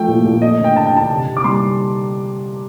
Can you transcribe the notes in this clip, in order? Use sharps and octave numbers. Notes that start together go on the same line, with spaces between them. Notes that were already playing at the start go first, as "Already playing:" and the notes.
Already playing: F3 A3 G5
A#2
A#2
A3 D#5
D3 G5
D3 A5
G5
D3 A5
C3
C3
D6
G3 C6